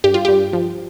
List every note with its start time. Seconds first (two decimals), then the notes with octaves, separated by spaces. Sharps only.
0.04 G2 G4
0.14 F4
0.25 G2 G4
0.53 F3